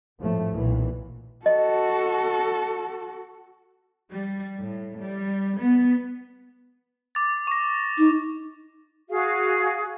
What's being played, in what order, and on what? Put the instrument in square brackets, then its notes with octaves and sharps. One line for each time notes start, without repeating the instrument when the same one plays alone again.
[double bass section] G#1 A2 F3 A3
B1 A#2 E3
[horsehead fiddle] F#4 A4 [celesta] D#5
[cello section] G3
A2
G3
B3
[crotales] D6 A6
C#6 A#6
[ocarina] D#4
[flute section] F#4 G#4 F5